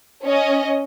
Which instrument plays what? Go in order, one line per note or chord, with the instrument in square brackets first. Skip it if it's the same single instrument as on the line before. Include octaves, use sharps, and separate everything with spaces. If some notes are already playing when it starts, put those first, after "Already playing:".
[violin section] C#4 D#5